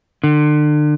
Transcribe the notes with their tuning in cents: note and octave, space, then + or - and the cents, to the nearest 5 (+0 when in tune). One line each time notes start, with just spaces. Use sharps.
D3 +35